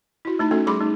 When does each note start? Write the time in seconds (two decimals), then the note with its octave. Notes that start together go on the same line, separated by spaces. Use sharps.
0.25 E4 F#4
0.39 A3 D#4 B5
0.51 A3 C#4 F#4 A4
0.67 G3 A3 G#4 B5 C6 D6
0.80 A3 D#4